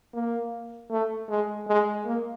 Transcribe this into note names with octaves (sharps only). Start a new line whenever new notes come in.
A#3
A3
G#3
G#3
A#3